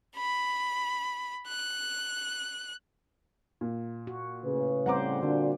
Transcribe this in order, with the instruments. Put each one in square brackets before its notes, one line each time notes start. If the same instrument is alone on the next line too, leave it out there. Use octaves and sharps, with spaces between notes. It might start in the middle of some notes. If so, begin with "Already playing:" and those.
[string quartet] B5
F#6
[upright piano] A#2
[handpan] F#4
[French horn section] A2 C#3 [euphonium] B4
[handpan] G3 C4 C5 [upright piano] F#5 A#5 D6
[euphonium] A#2 [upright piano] D3 [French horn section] D4 F#4